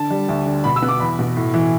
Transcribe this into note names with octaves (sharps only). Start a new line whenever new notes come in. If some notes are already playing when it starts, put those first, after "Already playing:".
Already playing: D3 A5
G3
D2
D3
B2 B5
E6
B3
D6
E2 B5
B2
A2
E3